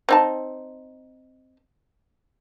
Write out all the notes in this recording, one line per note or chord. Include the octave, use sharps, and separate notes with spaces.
C4 D#4 A5